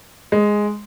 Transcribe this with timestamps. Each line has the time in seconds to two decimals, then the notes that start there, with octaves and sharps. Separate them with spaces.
0.32 G#3